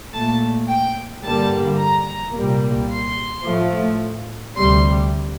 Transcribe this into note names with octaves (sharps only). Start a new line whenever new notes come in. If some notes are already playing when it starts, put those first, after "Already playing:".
A#2 A3 A5
G5
G2 D3 G3 A#3 A5
A#5
C2 A#2 G3 A#3
C6
A2 F3 A3
D2 C3 G3 C6